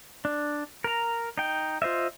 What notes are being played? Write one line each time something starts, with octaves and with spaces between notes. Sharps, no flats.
D4
A#4 A#5
D#4 G5
F4 C5 D#5 E5